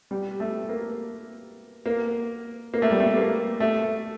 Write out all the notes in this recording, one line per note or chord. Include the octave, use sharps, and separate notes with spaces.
G3
A3
A#3
A#3
A#3
A3
G3
A3
A#3
A3